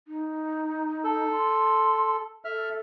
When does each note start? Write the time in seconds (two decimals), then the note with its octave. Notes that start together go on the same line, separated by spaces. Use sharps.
0.08 D#4
1.04 A4
1.32 C6
2.45 A4 E5 F6